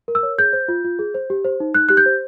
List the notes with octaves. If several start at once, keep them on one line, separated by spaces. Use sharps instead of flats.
A#4
E6
C#5
G#4 G6
C5
F4
F4
G#4
C5
G4
C5
D#4
D#4 F#6
G4 F#6
G6
C5